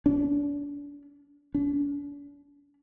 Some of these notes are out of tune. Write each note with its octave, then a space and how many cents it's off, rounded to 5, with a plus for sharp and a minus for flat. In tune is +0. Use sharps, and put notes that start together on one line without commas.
D4 -35
D4 -45